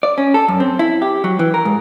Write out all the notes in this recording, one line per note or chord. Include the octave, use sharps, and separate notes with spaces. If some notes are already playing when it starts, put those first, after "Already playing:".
D5
C#4
A4
F#2
C4
E4
G4
F#3
E3
A#4
G#2